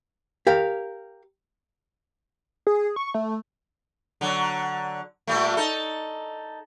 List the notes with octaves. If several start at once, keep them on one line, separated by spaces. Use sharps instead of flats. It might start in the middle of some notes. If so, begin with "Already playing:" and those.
G4 A#4 F5
G#4
C#6
A3
D3 F#3
A#2 G3 A3
D#4 A4